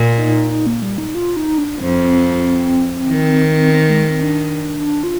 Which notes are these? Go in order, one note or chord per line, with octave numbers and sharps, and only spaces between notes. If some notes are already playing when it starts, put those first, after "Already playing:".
Already playing: A#2
D#4
D#4
A#3
G3
D#4
F4
D#4
D4
F2 F3 C4
D#3
C4
G#3
C4
D4
F4